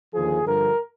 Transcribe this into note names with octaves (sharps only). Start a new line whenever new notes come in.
D#2 D3 F3 G#4
G2 D3 F3 A#4